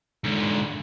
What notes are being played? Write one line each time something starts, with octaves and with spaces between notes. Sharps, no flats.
G#2 D3